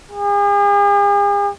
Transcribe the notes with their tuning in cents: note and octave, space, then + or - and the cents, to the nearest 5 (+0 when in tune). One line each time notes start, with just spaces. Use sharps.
G#4 -45